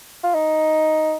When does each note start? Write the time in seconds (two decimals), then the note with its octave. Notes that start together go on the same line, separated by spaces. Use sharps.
0.23 F4
0.34 D#4